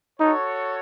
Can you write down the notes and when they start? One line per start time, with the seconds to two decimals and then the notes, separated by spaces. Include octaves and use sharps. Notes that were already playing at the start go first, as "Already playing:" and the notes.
0.20 D#4 F#4 A4 C#5